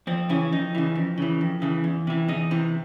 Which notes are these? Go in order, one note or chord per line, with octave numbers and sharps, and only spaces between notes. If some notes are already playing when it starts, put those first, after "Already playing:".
F2 C4
C#3 E3 C#4
F2 D#4
C#3 E3
F2
C#3 E3
F2
C#3 E3
E2
C3 E3
E2 D#4
C3 E3